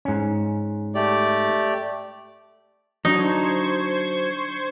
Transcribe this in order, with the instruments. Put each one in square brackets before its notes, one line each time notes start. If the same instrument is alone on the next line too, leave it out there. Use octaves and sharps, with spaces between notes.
[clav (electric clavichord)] G#2 C#4
[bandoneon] A3 G4 D5
[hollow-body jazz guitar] F#3 [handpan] D4 [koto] D#4 [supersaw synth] C5 C#6 G#6